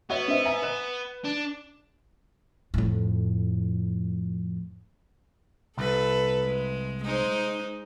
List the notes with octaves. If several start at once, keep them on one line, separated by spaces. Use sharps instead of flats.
B3 F#4 C#5 E5
C4 D#4 E5
E5 G#5 A#5
B4 E7 F#7
D4
F2 A2
C2 A4 B4
G#3
G#3 D#4 C5